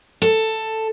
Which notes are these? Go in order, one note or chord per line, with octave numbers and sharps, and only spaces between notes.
A4